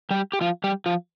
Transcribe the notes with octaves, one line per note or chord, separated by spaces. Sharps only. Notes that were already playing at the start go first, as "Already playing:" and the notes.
G3 G4
G4
F3 F4
G3 G4
F3 F4